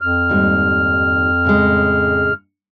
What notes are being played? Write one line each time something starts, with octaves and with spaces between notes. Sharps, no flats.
F2 F6
D#2 G#2 G3
A2 C#3 G#3